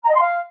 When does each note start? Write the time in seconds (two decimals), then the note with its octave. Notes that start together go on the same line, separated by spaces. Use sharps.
0.03 A#5
0.08 D#5
0.14 C6
0.19 F5